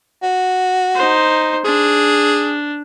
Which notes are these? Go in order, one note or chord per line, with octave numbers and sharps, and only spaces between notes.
F#4
D#4 C5
D4 G#4